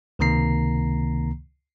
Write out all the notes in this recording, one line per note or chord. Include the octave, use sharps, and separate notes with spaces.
C#2 C3 D#3 A#3 A#5 C7